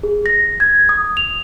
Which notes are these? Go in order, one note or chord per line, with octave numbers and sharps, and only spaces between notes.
G#4
A#6
G#6
D#6
F7